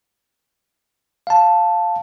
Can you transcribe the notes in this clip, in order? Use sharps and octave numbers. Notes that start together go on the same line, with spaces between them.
F5 A5